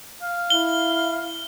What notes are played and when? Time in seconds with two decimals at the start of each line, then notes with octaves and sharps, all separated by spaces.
0.22 F5
0.50 E4 G7